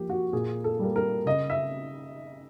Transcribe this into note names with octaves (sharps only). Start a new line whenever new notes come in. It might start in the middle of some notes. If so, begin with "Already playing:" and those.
Already playing: F3 A#3 G4
F#4
A#2 G#4
A4
G3 A#3
A#4
C#3 D#5
E5